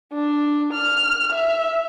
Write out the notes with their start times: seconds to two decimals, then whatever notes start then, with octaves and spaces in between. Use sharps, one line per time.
0.13 D4
0.73 F6
1.32 E5